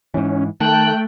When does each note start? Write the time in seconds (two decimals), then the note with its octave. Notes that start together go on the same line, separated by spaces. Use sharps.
0.14 G#2 E3 C#4
0.60 D#3 A3 G5 A5 F#6